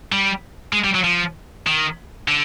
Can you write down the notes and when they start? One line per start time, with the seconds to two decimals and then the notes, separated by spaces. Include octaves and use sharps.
0.12 G3
0.73 G#3
0.84 G3
0.95 F#3
1.04 F3
1.66 D#3
2.28 D3